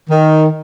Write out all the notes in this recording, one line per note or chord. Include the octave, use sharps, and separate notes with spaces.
D#3